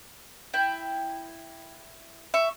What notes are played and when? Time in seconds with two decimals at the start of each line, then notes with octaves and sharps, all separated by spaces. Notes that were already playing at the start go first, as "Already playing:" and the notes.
0.54 E4 G5
2.34 E5 C#6